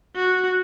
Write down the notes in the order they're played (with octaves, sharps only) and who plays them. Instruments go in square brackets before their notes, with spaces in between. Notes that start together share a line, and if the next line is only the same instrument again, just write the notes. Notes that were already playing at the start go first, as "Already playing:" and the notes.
[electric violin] F#4